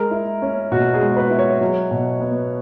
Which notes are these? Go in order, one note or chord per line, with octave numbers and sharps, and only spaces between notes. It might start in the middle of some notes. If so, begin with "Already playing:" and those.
Already playing: G#3 A#4
E4
C#4
B2 F#4
G#4
G#3
B4
E4
C#5
F#3
B2
B3